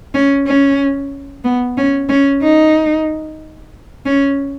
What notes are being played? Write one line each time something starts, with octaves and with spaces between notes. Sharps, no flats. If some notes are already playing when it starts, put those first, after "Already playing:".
C#4
C#4
B3
C#4
C#4
D#4
C#4